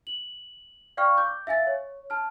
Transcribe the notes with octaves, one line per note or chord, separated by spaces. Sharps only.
F#7
D5 F5 G5 C#6 F6
D6 G6
E5 F5 G#5 A6
C#5
A5 F6